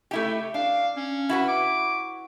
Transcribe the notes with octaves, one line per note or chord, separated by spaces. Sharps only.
A3 E4 G4
D4 F5
C#4
E4 F#4 B4
D6